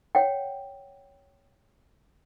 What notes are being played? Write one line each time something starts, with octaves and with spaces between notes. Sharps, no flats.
C#5 F#5 G5